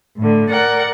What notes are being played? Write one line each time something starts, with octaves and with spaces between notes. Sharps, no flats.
A2 D3
A#4 D5 F#5